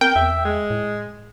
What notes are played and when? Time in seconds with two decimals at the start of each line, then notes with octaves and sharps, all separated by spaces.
0.01 C4 A#4 G5
0.16 E2 E5
0.45 G#3
0.70 A2